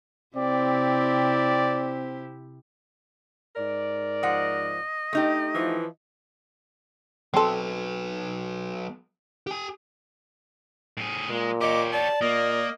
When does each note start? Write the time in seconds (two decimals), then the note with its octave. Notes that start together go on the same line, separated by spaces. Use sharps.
0.37 C3 C4 E4 G4 D5
3.56 G#2 A#4 D5
4.23 F3 D#5 F#5
5.13 A3 D#4 G4
5.55 E3 F3
7.34 F#3 B3 C4 A4
9.47 G4 G#5
10.97 A2 G#4
11.30 A#2 G#3
11.61 G4 C#5 D#5 D6
11.93 D5 A5
12.21 A#2 A#3 D#5